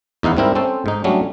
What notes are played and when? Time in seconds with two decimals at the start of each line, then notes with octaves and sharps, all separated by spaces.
0.23 E2 D#4 E4 F5 F#5
0.37 G#2 G3 C4 E4 A#4
0.55 C4 C#4 A4 C5
0.86 G#2 D#4
1.04 F#3 G3 A3 C#4 D4